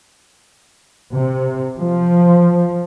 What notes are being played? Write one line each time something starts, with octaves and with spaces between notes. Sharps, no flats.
C3
F3